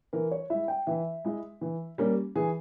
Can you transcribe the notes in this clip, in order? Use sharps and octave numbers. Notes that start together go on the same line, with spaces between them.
E3 A#4
C#5
G#3 E4 E5
G5
E3 E5
G#3 E4
E3
G3 A#3 C#4
E3 G#4